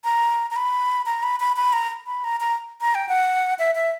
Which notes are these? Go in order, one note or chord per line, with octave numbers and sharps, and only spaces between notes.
A#5
A#5
B5
A#5
B5
B5
B5
A#5
B5
A#5
A#5
A#5
G5
F#5
E5
E5